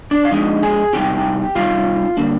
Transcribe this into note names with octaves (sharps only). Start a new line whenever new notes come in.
D4 D5
F5
F3 G#3 D4 D#4 D#5
G#4 G#5
C3 G3 C4 D#4 G4 G5
C3 G3 C4 D#4 F4 F5
D3 G3 A#3 D4